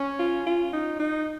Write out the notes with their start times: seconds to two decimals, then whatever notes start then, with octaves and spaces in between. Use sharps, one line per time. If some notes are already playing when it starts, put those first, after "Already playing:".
Already playing: C#4
0.19 F4
0.47 F4
0.73 D#4
1.00 D#4